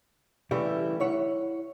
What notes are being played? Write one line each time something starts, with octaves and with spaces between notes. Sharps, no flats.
C#3 E3 G3 A3 E4 G4
E4 C#5 F#5